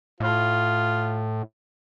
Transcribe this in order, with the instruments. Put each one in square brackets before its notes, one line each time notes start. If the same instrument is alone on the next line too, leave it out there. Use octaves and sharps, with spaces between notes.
[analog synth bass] A2 [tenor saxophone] F4